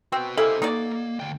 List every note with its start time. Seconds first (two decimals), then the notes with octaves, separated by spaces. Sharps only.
0.12 C4 F#4 B4
0.38 G#3 A#3 E4 G4 A4 C5
0.62 A#3 D#4 F#4 D5
1.20 D2 G5